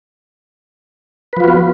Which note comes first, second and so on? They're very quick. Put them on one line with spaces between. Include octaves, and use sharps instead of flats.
B4 F3 F4 F#4 B3